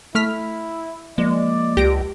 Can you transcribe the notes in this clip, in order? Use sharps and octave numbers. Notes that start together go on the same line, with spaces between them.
A3 E4 F6 B6
F3 G#3 A#3 D5
C#2 G4 A#6 D7